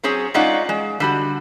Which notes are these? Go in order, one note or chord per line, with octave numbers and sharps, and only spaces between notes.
F#3 C4 C#4 G#4
G#3 C#4 D#4 F4 D5 F#5
G#3
D3 G3 F#4